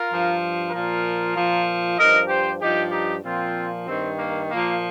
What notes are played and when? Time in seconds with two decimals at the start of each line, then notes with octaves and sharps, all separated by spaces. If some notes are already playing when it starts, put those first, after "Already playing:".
Already playing: F4 A#4
0.08 G2 F3
0.71 A#2 F3 F4 A#4
1.35 A#2 F3
1.97 G2 F3 A#4 D#5
2.28 G4 C5
2.60 G2 F3 D#4 G4
2.91 D#4 G4
3.22 A#2 F3 C4 F4
3.85 G2 D#3 C4
4.17 A#3
4.49 A#2 F3 A#3